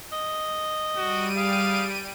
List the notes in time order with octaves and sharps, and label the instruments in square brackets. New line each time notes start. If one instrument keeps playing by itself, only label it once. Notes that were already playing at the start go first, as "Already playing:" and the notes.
[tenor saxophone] D#5
[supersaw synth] G3 D7 D#7 [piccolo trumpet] F#4
[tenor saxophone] G#4 [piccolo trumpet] F5